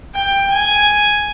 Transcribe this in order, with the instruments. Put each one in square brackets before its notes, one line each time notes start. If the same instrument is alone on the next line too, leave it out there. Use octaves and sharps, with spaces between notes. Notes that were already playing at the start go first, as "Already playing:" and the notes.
[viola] G5
G#5